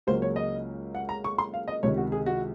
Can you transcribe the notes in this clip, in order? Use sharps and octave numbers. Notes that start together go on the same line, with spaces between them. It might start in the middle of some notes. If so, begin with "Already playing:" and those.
C#2 C#3 F#3 A#3 C5
C#5
D#5
F#5
A#5
C#6
C6
F5
D#5
C#2 C3 D#3 C#5
F#4
G#4
F#4